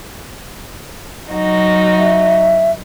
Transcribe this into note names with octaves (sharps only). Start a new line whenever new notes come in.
F#3 D#4 F#4
E5